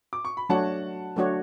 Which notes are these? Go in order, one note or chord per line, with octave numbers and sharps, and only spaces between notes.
D6
C#6
B5
F#3 A3 D4 F#4 C#5 F#5 A5
F#3 A3 D4 F#4 C#5